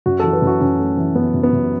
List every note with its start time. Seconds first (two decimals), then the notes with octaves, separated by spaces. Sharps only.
0.06 F#2 F#4
0.20 E3 A4
0.33 B4
0.42 F#2 F#4
0.60 F#2 C#4
0.79 A3
0.97 E3
1.15 F#2 B3
1.34 F#2
1.43 B3
1.53 F#2